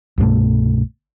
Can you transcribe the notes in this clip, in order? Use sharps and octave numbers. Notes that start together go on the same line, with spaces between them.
C2 G2 B2 A3